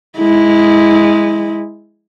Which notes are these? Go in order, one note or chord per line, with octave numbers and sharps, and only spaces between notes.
G#3 E4